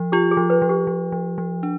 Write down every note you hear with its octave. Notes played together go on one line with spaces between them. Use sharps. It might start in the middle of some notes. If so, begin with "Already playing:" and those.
Already playing: F3
F4 G4
G#4
F3
B4
F3
G4
F3
F3
F3
D4